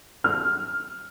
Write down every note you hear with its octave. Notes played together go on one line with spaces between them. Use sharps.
F6